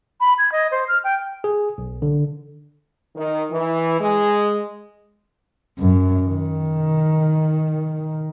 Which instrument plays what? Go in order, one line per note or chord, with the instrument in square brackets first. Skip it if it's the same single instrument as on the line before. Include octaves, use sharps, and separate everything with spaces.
[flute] B5
G#6
D#5
C5
F6
G5
[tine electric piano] G#4
B1
D3
[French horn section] D#3
E3
G#3
[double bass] F#2
D#3